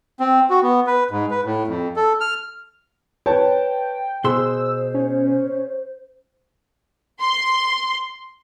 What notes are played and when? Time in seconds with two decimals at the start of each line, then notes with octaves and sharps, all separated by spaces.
0.20 C4
0.50 F#4
0.62 B3
0.87 B4
1.11 G#2
1.31 B4
1.45 A2
1.67 F2
1.96 A4
2.21 F6
3.26 B4 C#5 G5 A5
4.24 B2 G#4 C5 C6 E6
4.94 C#4
7.20 C6